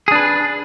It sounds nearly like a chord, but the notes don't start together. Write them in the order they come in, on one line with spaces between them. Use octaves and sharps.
G#4 D4 B4